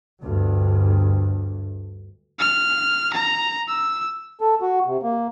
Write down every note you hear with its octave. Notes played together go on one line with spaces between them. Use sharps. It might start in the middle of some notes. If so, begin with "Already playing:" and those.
G1 D2 G2
F6
A#5
E6
A4
F#4
C3
A#3